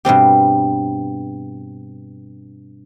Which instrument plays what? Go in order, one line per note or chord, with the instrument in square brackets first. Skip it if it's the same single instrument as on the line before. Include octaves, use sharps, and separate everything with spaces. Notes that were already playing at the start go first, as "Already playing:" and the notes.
[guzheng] G2 B2 C4 G4